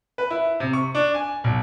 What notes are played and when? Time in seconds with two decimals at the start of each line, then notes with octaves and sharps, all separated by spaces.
0.18 B4
0.30 E4
0.60 C3
0.73 C#6
0.95 D4
1.14 G#5
1.44 B1